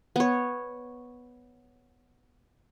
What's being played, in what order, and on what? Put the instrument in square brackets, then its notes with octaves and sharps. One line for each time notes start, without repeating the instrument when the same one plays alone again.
[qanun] B3 C#5